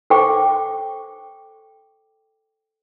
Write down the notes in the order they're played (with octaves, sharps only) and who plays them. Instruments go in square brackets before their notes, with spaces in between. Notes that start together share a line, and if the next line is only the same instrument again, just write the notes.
[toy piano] A4 C5 G5 C#6 D6